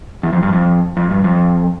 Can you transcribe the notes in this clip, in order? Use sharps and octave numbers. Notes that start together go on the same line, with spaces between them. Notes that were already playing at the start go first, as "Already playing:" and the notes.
E2
F2
G2
F2
F2
G2
F2